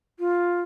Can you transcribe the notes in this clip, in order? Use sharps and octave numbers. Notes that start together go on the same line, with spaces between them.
F4